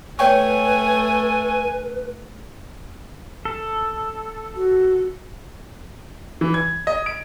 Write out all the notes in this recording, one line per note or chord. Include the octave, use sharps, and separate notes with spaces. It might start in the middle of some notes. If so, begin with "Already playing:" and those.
A3 B4 C#5 G5 G#5 C#6
A4
F#4
E3
G#6
D#5
D7